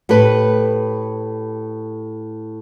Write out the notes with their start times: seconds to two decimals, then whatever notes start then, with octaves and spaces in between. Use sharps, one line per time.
0.09 A2 G4 A4 B4